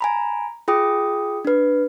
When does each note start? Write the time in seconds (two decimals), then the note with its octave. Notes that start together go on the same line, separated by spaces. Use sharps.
0.01 G#5 A#5 B5
0.68 F4 G#4 G5 D#6
1.45 D4 B4